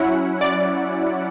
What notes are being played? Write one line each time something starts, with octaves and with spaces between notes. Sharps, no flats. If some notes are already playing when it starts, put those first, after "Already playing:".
Already playing: F#3 C#4 E4 F#5
D5